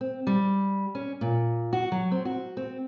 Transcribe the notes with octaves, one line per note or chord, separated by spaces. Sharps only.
C4
G3
C#4
A#2
F#4
F#3
C4
F#4
C4